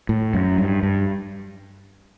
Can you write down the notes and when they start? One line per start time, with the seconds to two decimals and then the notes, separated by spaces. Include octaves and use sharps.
0.09 A2
0.34 F#2
0.58 G2
0.83 G2